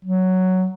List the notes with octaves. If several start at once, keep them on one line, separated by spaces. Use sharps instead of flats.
F#3